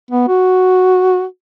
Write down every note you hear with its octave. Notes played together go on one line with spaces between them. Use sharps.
B3
F#4